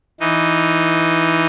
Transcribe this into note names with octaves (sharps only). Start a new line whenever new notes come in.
E3 D#4